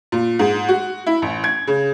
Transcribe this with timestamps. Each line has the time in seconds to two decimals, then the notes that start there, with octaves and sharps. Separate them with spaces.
0.12 A#2
0.39 G#2
0.69 F#4
1.07 E4
1.22 A1
1.44 G#6
1.67 C#3